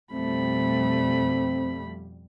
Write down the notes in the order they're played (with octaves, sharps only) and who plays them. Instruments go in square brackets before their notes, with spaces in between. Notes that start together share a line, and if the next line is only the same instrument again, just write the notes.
[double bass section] F2 B2 G3 [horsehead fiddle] A3 B5 [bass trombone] C4